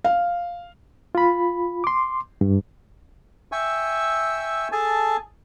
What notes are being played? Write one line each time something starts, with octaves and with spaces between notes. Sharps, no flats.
F5
F4 B5
C6 D6
G2
E5 G5 G#5 C#6 E6
G#4 A4 G#5 A5